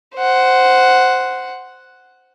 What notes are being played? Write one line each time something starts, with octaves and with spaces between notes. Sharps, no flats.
C5 F#5